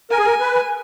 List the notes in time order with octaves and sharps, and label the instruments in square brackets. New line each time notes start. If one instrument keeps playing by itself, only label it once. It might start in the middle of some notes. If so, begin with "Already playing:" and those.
[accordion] A#4 [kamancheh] G#5
[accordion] G#4
A#4
B4